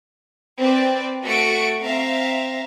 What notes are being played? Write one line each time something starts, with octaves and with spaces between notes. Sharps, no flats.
C4 B4 D5
A3 F#4 A4 C#6 C#7 D7
C4 E5 F5 A#5